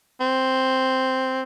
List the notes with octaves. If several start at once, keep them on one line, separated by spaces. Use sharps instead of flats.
C4